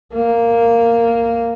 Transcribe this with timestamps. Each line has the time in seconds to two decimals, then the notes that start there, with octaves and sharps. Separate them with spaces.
0.13 A#3